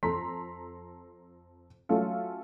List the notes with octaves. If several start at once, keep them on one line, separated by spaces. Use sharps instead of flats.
F2 A4 A#5 C6 B6
F#3 A3 C#4 F4 A4